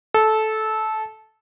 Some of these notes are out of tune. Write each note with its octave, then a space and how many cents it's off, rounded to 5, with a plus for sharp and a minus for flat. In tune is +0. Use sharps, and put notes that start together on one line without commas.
A4 -15